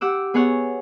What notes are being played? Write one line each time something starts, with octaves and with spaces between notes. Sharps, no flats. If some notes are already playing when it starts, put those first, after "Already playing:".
G4 F#5 D6 E6
B3 G#4 C#5 F#5